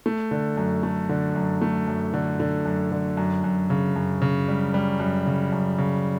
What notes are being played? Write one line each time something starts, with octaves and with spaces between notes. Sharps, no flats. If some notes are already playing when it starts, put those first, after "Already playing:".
A3
D3
F#2
A3
D3
F#2
A3
F#2
D3
D3
F#2
D3
F#2
F#2
C#3
F#2
C#3
G3
G3
F#2
C#3
F#2
C#3